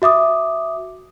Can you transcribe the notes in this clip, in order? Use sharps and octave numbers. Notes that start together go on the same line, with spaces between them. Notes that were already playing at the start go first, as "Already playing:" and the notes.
F#4 E5 D6 D#6